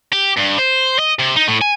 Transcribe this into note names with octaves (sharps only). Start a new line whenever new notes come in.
G4
G2
C5
D#5
C3
D#4
A2
G#5